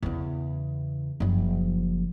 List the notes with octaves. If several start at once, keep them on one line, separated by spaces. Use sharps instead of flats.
E2 C#3
F#1 F3